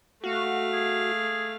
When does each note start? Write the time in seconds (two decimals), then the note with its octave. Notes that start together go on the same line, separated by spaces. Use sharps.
0.24 A3 F#4 F5
0.74 G#4